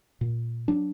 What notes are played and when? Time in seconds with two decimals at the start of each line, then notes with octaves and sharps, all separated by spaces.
0.21 A#2
0.68 F#3 D4